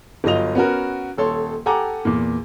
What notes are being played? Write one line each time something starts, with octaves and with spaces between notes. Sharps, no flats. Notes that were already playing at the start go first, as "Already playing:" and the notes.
G1 F#3 F4 D#5 F7
B3 C#4 F#4 A#4
D#1 A4 C#5 C6
G4 A4 F#5 G#5 A#5 D6
E2 A#2